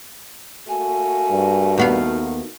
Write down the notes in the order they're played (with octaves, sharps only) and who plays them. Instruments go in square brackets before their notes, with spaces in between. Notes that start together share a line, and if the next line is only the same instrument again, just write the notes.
[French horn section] A3 A#3 F#4 [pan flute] G#5
[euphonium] G2
[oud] D#2 B3 F5 [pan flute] D#4